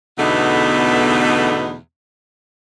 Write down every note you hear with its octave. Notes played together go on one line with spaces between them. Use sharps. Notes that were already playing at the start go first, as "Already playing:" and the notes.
E2 B2 D3 A3 B3 D#4